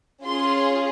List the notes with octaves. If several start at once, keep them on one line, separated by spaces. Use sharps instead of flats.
C#4 F4 G#4 C6